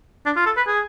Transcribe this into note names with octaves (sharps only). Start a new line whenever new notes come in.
D4
F4
A4
B4
G#4